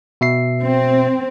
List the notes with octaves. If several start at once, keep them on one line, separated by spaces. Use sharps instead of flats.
B2 E5 C7
C4